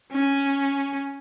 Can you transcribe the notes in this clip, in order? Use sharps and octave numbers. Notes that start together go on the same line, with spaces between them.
C#4